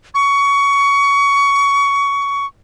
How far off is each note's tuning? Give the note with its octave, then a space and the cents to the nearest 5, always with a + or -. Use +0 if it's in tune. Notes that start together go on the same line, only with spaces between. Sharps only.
C#6 +20